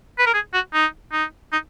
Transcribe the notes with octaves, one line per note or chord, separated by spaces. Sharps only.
B4
A#4
G#4
F#4
D#4
D#4
D#4